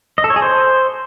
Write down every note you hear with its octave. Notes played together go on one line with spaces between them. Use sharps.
D#5
A4
C#5
G#4
C5